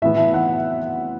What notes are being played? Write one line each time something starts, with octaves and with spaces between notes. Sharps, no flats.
A2 E3 B3 E4 E5
F#5